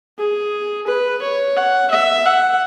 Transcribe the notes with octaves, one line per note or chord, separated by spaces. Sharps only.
G#4
B4
C#5
F#5
E5
F#5